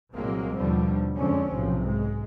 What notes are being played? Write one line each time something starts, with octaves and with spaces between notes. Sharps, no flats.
C2 A#2 F#3 G#3 A#3 C4
D#2 B2 D3 F3 G3
F2 D3 F3 G#3 C4 C#4
B1 A2 C3 F3
G#2 G#3